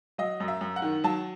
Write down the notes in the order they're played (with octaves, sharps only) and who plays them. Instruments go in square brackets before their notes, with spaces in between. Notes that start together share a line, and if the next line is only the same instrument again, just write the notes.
[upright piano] F#3 D#5
F#2
E5
F#2
F#5
D#3
F#3 A5